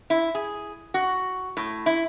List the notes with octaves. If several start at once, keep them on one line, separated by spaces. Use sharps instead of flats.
E4
G#4
F#4
A2
E4